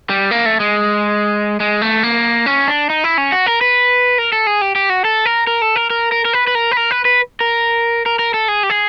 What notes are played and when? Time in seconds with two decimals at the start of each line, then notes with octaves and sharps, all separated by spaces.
0.10 G3
0.31 A#3
0.46 A3
0.60 G#3
1.60 G#3
1.82 A3
2.03 A#3
2.46 C#4
2.68 D4
2.90 D#4
3.04 E4
3.18 C#4
3.32 F#4
3.46 A#4
3.61 B4
4.18 A#4
4.32 A4
4.47 G#4
4.61 G4
4.75 G4
4.90 F#4
5.04 A4
5.25 A#4
5.47 A#4
5.62 A4
5.76 A#4
5.90 A#4
6.12 A#4
6.25 A#4
6.33 B4
6.47 B4
6.55 A#4
6.72 B4
6.77 A#4
6.91 B4
7.05 B4
7.41 A#4
8.06 A#4
8.19 A#4
8.34 A4
8.48 G#4
8.63 G4
8.70 G#4